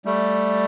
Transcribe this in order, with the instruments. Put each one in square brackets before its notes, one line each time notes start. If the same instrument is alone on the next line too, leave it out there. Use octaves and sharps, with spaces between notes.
[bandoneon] G3 A3